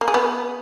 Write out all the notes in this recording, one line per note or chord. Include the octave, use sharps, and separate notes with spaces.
A#3
G#4
B3